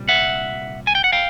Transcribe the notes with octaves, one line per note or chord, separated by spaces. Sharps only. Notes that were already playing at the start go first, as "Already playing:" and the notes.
Already playing: C2 A#2 G3
E5 F#5
G#5
G5
F#5
F5 G5